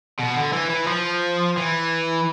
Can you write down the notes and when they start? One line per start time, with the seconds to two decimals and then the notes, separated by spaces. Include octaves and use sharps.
0.19 B2
0.35 D3
0.53 E3
0.70 E3
0.87 F3
1.57 E3